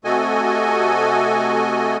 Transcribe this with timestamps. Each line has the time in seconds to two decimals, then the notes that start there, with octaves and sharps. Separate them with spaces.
0.04 C3 A3 F#4 A4 D#5 G#5